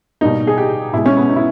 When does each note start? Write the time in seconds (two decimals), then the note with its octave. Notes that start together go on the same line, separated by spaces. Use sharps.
0.21 B2 G3 A#3 D#4
0.47 G#4
0.58 G4
0.93 B2 G#3 E4
1.06 C#4
1.17 B3
1.29 D#4
1.36 E4